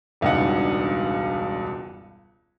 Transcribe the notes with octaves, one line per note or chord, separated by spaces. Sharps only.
E1 C#2 G2 D#4 F#5